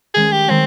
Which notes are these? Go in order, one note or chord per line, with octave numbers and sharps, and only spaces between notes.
D#3 G#3 C#4 G#4
G4
D#3 G#3 C4 C#4